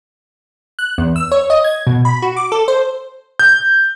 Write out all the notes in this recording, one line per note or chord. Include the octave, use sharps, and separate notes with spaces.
F#6
E2
E6
C#5
D#5
G#6
B2
B5
F#4
D6
A4
C5
G6